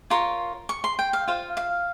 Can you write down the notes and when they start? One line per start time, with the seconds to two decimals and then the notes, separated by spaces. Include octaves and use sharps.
0.10 F4 A#4 C#5 C6
0.69 C#6
0.84 C6
0.99 G5
1.13 F5
1.28 F4 C5 F5
1.57 F5